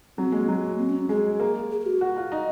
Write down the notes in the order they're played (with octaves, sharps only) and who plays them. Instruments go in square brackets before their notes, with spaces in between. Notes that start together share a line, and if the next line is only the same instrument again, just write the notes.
[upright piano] F#3 [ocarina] C4
[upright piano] G#3 [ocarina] A#3
[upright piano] F#3
[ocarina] C4
C#4
[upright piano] G#3 [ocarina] G#4
[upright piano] A#3
[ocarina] G#4
G#4
F#4
[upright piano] F#4
F4
D#4